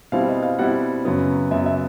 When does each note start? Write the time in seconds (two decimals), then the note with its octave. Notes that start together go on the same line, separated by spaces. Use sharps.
0.12 B2 G3 C4 E4 F5
0.28 D#5
0.43 F5
0.59 B2 G3 C4 E4 F#5
1.05 F#2 C#3 F#3 B3
1.51 F#2 C#3 F#3 B3 E5
1.66 E5